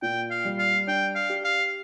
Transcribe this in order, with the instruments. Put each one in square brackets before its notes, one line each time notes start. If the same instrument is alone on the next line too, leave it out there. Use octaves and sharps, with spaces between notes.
[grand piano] A#2 [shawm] G5
[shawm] F5
[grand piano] G3
[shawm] F5
[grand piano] D4 [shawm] G5
[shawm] F5
[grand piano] G4
[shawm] F5